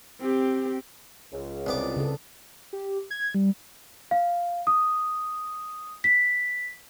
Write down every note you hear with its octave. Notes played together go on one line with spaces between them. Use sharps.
C4 G4
C#2
C2 B3 D5 D6
C#3 A4
G4
G#6
G3
F5
D#6
B6